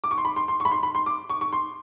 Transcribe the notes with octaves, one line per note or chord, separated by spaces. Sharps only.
D6
C#6
C6
B5
C6
C6
C#6
B5
C6
B5
C6
D6
C#6
C#6
C6